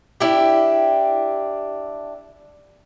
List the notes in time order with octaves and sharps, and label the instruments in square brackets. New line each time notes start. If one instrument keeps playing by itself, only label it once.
[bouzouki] D4 E4 G4